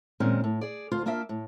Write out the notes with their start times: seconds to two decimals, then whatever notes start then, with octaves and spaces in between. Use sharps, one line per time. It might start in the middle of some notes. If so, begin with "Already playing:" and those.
0.20 A#2 D#3 G#3 C4 C#4
0.44 A2
0.61 G#4 D5
0.91 D2 F4 C5
1.06 A#3 D4 F4 D5 E5
1.29 A2